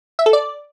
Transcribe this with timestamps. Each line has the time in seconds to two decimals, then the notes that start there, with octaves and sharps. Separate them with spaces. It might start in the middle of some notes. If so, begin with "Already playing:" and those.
0.19 E5
0.26 A4
0.33 D5